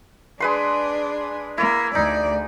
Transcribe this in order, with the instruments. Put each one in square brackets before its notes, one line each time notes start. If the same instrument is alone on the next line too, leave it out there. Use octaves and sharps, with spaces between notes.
[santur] G#3 B4 C6 [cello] D4
[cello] A#3 [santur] E4
[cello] D2 D5 [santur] D#4